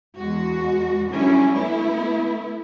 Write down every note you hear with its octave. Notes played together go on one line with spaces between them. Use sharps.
E2 G#3 F#4
D3 F#3 G3 C#4 E4
A3 B3 E4